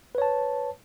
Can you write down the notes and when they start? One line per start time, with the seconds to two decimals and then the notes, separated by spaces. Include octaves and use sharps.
0.15 B4
0.18 C#5
0.22 A5